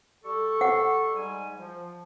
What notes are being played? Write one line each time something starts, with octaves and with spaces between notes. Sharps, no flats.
G3 A4 C#6
F#5
G#2 G3 G#5
F3